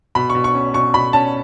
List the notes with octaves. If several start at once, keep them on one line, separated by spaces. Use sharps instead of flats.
B2 B5
C#6
B2
C#6
C#4
B2 C#6
B2 B5
C#4 A5